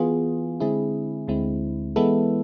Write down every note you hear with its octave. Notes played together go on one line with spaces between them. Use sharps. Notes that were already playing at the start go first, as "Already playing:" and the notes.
Already playing: E3 B3 F4 G#4
D3 G#3 C4 E4 G#4
D2 D3 G#3 C4 E4
E3 G#3 B3 E4 A4